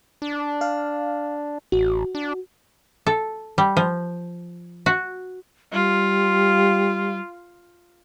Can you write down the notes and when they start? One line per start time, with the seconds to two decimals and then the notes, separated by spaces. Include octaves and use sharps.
0.22 D4
0.61 F5
1.72 A1 F#4
2.15 D4
3.07 A4
3.58 G3
3.77 F3
4.86 F#4
5.73 G3 F4